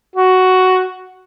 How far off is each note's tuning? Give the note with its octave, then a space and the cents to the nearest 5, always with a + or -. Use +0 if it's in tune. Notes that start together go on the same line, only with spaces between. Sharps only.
F#4 +5